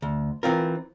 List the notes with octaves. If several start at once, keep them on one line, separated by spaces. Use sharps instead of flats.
D2
E3 C4 F4 A#4